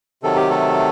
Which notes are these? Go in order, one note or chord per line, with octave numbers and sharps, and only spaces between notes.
C3 D#3 F#3 A4
G4
A3 A4